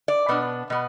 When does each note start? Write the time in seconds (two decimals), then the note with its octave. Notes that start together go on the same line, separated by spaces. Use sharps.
0.08 D5
0.29 B2 B3 D4
0.70 B2 B3